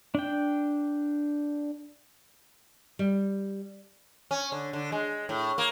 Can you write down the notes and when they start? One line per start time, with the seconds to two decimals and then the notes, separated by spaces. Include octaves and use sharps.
0.15 D4 G5
2.99 G3
4.31 C#4
4.52 D3
4.73 D3
4.92 G#3
5.29 A2
5.58 A#3